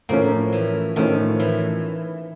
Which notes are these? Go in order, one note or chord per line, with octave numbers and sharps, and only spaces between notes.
A2 F3 A3 A#3 C#4
E3
A2 D#3 F3 A3 C#4
E3